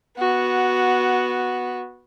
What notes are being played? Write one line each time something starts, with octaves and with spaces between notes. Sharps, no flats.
B3 F#4